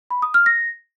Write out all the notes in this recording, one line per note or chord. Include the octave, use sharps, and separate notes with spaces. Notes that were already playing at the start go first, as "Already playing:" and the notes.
B5
D#6
F6
A#6